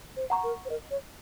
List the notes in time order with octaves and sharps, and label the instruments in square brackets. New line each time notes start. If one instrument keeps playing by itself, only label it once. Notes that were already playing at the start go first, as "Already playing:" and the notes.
[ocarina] C5
[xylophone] F#5 A#5 C#6
[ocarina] A#4
C5
[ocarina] A#4 [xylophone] D#5
[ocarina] C#5